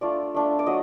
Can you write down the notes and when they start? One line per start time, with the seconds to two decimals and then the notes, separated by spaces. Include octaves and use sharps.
0.01 A3 D4 F4 D5
0.34 A3 D4 F4
0.59 D5
0.66 F#3 D#5